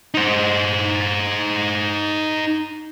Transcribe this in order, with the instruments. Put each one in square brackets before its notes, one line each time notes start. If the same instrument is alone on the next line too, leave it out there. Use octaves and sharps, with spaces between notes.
[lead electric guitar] D#4 C5